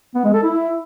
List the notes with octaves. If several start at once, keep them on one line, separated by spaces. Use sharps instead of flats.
B3
G#3
A4
E4